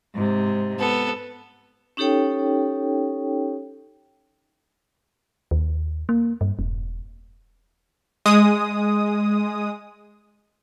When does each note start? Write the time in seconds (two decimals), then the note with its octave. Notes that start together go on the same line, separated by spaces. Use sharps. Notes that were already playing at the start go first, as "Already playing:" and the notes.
0.15 G#2 C3
0.79 B3 A4
1.97 C#4 D#4 G4 A4 C#5 G5
5.51 D#2
6.09 A#3
6.41 G2
6.59 E1
8.26 G#3 D#6